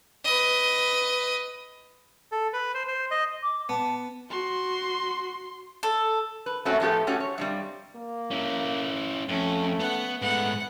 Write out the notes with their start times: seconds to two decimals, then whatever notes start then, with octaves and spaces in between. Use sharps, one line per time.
0.25 B4 D#5
2.32 A4
2.53 B4
2.74 C5
2.88 C5
3.11 D#5
3.43 D6
3.69 B3 A5
4.31 F#4 C6
5.83 A4
6.46 B4
6.65 A3 C4 C#4 F#4
6.80 A2 F3 A3 B3 G4 A4
7.07 A3 C#4 F#4 G4
7.20 C#5
7.38 G2 C3 G3
7.96 A#3
8.31 C#4 E4
9.29 F2 A3 C#4
9.80 B3 F#5
10.22 G#2 A3 B3 F#5